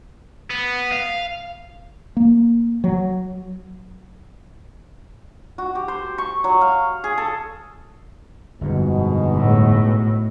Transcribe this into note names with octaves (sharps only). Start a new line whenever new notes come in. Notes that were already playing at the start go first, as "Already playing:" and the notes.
B3
F5
A#3
F#3
F#4
G4
C5
C#6
F#3
F5
G#4
A4
G1 F2 G#2 B2 D3
A2